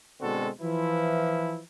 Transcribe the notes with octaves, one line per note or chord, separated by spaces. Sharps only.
B2 D3 G#3 C4 F#4 A4
E3 F3 E4